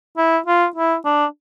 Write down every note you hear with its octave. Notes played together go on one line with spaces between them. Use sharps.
E4
F4
E4
D4